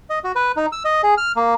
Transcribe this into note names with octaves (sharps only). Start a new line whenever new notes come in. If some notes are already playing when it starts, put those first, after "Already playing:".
D#5
F#4
B4
D#4
E6
D#5
G#4
F6
A#3